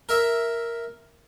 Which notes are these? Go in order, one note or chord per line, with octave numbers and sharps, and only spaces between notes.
A#4 E5